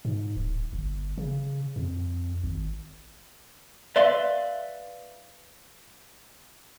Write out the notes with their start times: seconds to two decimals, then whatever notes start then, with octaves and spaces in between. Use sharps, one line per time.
0.05 G#2
0.36 D1
0.73 G1
1.18 C#3
1.76 F2
2.44 G#1
3.96 B4 D5 E5 F5 C6